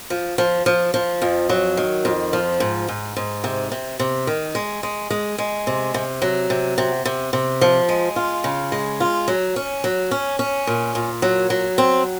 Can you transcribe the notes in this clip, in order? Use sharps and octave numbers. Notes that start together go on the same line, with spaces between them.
F3
F3
F3
F3
F2
F#3
D#3
F2
F3
G#2
G#2
G#2
C3
C3
C3
D#3
G#3
G#3
G#3
G#3
C3
C3
F#3
C3
C3
C3
C3
F3
G#3
F4
C#3
G#3
F4
F#3
C#4
F#3
C#4
C#4
A#2
A#2
F#3
F#3
C4